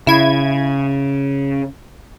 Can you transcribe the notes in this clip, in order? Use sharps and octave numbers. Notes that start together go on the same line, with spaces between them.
C#3 E4 G#6